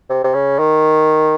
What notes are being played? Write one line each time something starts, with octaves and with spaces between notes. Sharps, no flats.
C3
C3
C#3
D#3